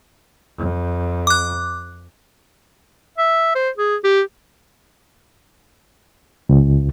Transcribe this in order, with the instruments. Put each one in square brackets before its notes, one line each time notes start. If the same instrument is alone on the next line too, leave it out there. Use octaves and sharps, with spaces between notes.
[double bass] F2
[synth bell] D6 F#6
[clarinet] E5
C5
G#4
G4
[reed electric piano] C#2